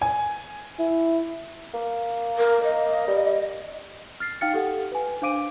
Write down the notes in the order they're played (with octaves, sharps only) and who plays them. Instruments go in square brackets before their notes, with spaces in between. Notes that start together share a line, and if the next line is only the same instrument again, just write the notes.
[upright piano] G#5
[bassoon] E4
A#3
[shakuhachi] A#4
D#5
[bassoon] G3
[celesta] F6 A6 C7
D#4 F5 G5 F6 A6 C#7
G4 A4 F#5
B4 G#5
D4 C5 F5 D6 D7 D#7